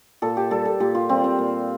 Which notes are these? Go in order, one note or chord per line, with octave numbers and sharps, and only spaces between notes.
A#2 A4
G4
G3 A4
A4
A#2 G4
F4
G3 C4
C4
A#2